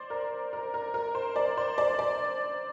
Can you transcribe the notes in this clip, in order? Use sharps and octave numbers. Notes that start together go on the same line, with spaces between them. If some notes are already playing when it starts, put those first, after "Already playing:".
Already playing: C5 D5
A#4
A#4
A#4
A#4
C5
D5
C5
D5
D5